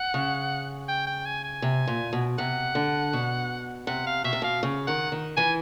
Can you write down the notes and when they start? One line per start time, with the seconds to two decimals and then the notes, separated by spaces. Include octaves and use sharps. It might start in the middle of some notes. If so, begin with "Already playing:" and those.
Already playing: F#5
0.14 C#3
0.88 G5
1.06 G5
1.26 G#5
1.44 G#5
1.62 C3
1.87 A#2
2.13 B2
2.38 C3 F#5
2.75 D3
3.13 B2
3.87 C3 F#5
4.07 F5
4.24 B2 E5
4.33 C3
4.42 B2 F5
4.63 C#3
4.87 D#3 F#5
5.12 D#3
5.37 E3 G#5